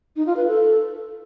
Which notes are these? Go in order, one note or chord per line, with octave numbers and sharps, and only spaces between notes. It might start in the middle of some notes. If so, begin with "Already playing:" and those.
D#4
F4
B4
A4